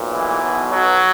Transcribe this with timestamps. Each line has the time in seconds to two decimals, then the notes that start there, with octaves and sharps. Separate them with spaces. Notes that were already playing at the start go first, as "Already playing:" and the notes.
Already playing: B1 A#2
0.12 E3
0.41 B1 B2
0.71 F#3